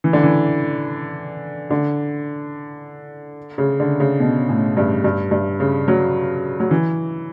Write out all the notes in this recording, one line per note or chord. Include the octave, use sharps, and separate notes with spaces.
E3
D3
E3
D3
C#3
D3
C#3
B2
A2
G2
G2
G2
C#3
F#3
F#3
E3